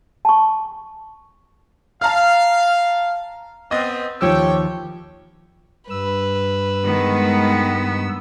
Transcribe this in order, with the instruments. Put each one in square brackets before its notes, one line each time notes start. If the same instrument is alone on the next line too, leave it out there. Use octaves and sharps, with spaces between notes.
[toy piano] A5 C#6
[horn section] F5 [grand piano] A5 A#5 F6
[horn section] B3 C4 [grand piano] D#5 A6
[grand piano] D#2 F3 E6 [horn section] G4 C#5 G5
[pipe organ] G2 E6 [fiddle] B4
[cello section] D#3 G#3 [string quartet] B3